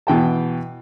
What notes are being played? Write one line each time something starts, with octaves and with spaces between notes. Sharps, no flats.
B2 E3 G5 A5